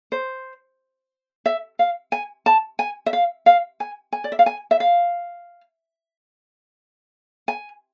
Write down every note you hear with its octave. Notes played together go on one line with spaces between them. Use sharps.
C5
E5
F5
G#5
A5
G#5
E5
F5
F5
G#5
G#5
D5
E5
F5
G#5
E5
F5
G#5